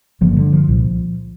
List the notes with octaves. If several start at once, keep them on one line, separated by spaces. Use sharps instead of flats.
G1 G2 D3 F3 A#3
D3 G3
F3
C2 A#2